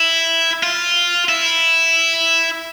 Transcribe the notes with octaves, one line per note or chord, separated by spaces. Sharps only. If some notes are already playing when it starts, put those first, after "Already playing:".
Already playing: E4
F4
E4